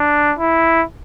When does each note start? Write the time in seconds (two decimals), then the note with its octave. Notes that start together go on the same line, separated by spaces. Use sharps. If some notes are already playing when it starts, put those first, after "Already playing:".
Already playing: D4
0.39 E4